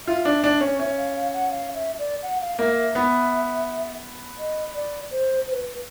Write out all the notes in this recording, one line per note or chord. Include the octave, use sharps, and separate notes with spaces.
F4 E5
D4
D4
C#4
C#4 E5
F5
F5
F#5
F5
E5
D5
F#5
F5
A#3 E5
E5
B3
D#5
D5
C5
C5
B4